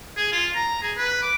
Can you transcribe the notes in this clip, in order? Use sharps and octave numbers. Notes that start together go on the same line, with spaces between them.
G#4
F4
A#5
G#4
B4
D6